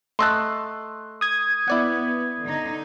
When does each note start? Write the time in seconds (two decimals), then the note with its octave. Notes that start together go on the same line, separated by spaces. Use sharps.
0.19 A3 D#5 A5 C6 E6 F#6
1.21 D#6 G#6
1.68 B3 E4 D5 F#5
2.45 D3 D#4